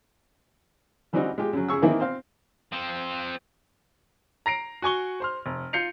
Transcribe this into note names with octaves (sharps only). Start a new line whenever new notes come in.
C#3 E3 G3 C4 D#4 F#4
G#3 F4 G4
F#2 C#3 F#3
F#2 C#3 G#4 C#6 E6
D#3 E3 A#3 C4 D#4 E4
C4 C5 F5
F3 C4
A#5 A#6 C7 D7
F#4 G#5 C#6 G7
C5 C6 F6
F1
F4 G6 C7 C#7 F7